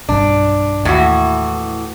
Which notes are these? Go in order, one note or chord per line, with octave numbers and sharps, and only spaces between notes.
B1 G2 D4
D#2 A2 E3 F#4